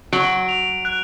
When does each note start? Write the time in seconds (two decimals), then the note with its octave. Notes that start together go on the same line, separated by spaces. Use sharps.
0.13 F#3 D7
0.49 F7
0.85 F#6